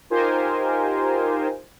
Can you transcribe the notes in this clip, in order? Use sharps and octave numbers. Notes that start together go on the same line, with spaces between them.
D#4 F4 G4 A#4 C5 G#5